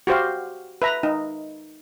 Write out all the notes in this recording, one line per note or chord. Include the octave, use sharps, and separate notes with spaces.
F#4 G4 C5 F5
B4 E5 A#5
D#4